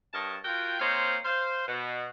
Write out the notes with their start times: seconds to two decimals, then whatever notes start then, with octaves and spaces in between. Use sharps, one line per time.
0.14 G2 A#4 C#5 D#5 A5
0.45 F4 F#4 A#4 G5
0.80 A#3 C4 D#4 C5 C#5 F5
1.25 C5 F5
1.68 B2